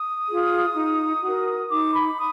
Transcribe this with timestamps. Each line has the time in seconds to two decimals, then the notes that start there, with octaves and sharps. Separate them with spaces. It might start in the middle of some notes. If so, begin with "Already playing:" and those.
Already playing: D#6
0.28 F4 G#4
0.74 D#4
1.22 F#4
1.27 A#4
1.69 D#4 D6
1.93 B5
2.17 D#6